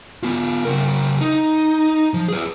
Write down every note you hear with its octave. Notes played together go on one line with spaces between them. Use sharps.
B3 F4
C#3 A#4
D#4
F3
G#4 B4